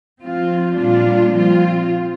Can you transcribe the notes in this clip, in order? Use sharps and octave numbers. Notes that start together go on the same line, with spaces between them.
F3 C4 F4
A#2 G3 D4 F4
F3 C4 F4